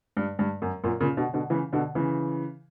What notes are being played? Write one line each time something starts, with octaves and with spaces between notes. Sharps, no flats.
G2
G2
F#2
F#2 A#2
A#2 C#3
B2 D3
B2 D3
C#3 E3
B2 D3
C#3 E3